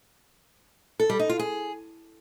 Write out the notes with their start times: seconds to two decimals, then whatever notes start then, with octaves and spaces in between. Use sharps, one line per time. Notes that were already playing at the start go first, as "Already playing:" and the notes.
1.00 A4
1.09 G3
1.19 D#4
1.29 F4
1.39 G#4